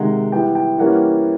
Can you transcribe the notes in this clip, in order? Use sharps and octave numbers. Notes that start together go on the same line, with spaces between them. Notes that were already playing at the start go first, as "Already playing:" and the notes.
Already playing: C3 D#3 G#3 F#5
E3 G3 B3 G5
G5
E3 G3 A#3 C#4 F#5